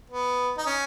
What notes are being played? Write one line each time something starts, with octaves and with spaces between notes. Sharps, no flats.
B3
D#4
C#4